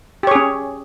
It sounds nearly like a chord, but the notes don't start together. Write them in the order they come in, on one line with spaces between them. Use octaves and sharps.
G4 C#5 G#4 C#4